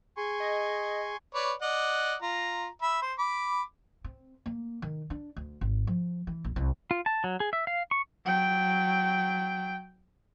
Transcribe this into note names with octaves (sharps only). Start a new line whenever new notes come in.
G#4 G#5 C6 C#6
D#5
B4 C#5 D5
D5 D#5 F#5
F4 A#5
E5 B5
C5
B5 D6
C4
A#3
D#3
D4
D2
G#1
F3
E3
A#1
C2
F4
A5
F#3
G#4
E5
F5
C#6
F#3 G5